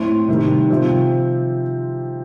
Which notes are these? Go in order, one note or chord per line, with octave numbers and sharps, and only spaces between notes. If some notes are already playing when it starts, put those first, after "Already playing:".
Already playing: A2 A3 C4 C6
C3 D#3 G3
C3 F3 C4